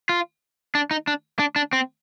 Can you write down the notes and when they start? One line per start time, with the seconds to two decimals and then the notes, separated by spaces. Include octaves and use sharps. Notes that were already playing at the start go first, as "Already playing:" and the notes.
0.09 F4
0.75 D4
0.91 D#4
1.07 D4
1.39 D4
1.56 D4
1.73 C4